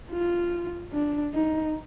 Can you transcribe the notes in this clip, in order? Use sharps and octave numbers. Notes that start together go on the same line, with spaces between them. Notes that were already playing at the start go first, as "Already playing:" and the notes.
F4
D4
D#4